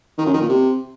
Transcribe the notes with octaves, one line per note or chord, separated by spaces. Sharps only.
D#3
F#2
D#3
A#2
C3